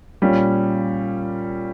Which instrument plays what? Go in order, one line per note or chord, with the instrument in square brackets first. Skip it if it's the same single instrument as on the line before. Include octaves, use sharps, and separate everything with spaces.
[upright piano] A#2 G3 C#4